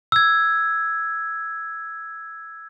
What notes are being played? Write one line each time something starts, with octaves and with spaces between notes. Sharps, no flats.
E6 G#6